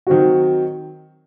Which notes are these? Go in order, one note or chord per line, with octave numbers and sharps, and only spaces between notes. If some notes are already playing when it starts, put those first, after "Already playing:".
D#3 F#3 C4 F#4